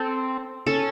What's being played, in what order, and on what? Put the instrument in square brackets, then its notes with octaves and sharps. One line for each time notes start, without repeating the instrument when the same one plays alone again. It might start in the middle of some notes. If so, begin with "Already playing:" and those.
Already playing: [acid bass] C4 [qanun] A4
[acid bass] C#4 [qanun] A4